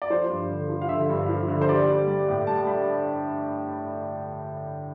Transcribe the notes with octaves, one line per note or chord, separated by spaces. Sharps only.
D5
F3 C5
G2
D3
F3
F5
D3 E5
G2
F3
D3
C5
G3 D5
G3
G3
A2
G3 A5
G3 B5